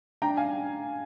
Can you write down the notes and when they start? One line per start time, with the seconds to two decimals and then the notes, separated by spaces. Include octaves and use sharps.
0.22 D4 G5 A#5
0.37 F5 G#5